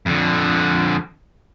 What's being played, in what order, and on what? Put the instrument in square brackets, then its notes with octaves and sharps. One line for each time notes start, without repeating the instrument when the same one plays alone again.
[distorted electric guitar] F2 D3